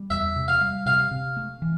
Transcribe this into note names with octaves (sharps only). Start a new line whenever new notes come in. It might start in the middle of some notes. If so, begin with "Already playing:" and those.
Already playing: G3
E2 E5
C3
F5
G3
C3 F5
C3
A3
E3